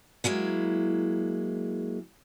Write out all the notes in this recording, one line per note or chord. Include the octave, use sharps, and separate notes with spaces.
F#3 G#3 A#3 E4